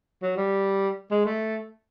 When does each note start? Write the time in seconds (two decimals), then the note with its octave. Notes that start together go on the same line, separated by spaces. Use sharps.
0.22 F#3
0.37 G3
1.11 G#3
1.25 A3